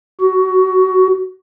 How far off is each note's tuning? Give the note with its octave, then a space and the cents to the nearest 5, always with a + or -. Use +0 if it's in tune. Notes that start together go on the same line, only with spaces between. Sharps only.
F#4 +20